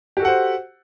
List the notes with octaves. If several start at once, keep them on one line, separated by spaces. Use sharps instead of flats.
F#4 G4 A4 C5 F#5